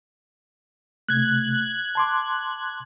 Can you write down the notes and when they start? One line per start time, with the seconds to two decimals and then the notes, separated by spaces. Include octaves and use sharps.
1.09 C3 A3 F#6 G#6
1.95 A5 C6 D6